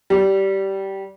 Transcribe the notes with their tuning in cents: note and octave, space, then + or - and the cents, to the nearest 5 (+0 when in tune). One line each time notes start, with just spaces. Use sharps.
G3 -15